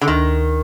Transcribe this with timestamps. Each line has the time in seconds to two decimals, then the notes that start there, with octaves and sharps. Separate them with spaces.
0.01 D3
0.08 D2 D#3